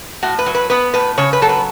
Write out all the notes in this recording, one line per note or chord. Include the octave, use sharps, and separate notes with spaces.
A2 F#4
B4
F#3
B4
B3 B4
A2 B4
C#3 C#5
B4
F#3 A4
B4